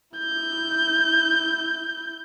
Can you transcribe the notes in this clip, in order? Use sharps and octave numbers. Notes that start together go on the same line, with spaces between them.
E4 G6